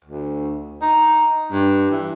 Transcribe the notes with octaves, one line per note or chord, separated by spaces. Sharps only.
D2
D#4
G2
E3